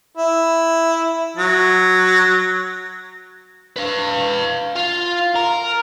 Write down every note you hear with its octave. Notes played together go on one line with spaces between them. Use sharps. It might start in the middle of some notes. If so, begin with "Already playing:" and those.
E4
F#3
B4 F5
F4
A#4